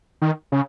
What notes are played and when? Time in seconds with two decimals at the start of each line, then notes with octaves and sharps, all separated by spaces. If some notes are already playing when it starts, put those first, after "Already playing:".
0.22 D#3
0.52 C#3